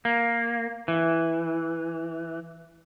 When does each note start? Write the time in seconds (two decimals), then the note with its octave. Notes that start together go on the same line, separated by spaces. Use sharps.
0.05 A#3
0.88 E3